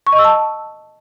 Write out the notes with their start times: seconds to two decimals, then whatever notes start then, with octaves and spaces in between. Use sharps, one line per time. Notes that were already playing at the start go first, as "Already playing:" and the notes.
0.07 C#6
0.13 D#5
0.19 E6
0.25 A5